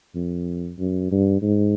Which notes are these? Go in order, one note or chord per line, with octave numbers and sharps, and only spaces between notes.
F2
F#2
G2
G#2